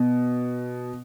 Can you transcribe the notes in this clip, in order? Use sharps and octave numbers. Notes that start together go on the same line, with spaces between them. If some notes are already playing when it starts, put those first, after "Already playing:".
Already playing: B2